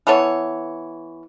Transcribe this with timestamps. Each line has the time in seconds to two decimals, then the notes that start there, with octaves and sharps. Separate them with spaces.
0.07 E3 B3 A4 C#5